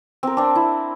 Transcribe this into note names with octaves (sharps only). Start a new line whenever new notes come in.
C4 A#4
C4 D4
E4